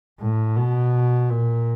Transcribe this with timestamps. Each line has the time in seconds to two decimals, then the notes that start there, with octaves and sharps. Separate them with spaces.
0.20 A2
0.56 B2
1.30 A#2